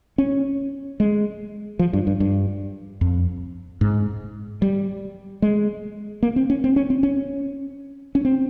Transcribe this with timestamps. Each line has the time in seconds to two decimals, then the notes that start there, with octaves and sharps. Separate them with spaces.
0.18 C#4
1.00 G#3
1.79 F3
1.93 G2
2.07 G2
2.20 G2
3.01 F2
3.81 G#2
4.62 G3
5.42 G#3
6.23 A#3
6.36 C4
6.50 C#4
6.64 C4
6.76 C#4
6.90 C4
7.03 C#4
8.15 C#4
8.25 C4